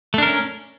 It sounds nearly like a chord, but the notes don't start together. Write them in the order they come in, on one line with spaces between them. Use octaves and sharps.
A3 D4 A#4 C#4